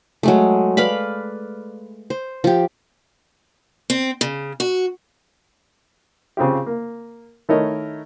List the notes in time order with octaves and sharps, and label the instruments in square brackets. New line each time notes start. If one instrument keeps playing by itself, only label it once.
[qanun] F#3 G#3 A3
B4 D5 F5 B5
C5
F3 G4
[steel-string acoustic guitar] C4
C#3
F#4
[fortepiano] C#3 C4 F4 G4
A#3
D#3 A3 E4 A#4 C#5 D#5